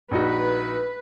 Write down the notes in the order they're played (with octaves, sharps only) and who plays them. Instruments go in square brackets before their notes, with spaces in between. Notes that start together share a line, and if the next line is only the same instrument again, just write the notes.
[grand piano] A#1 D#4 F#4 [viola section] B4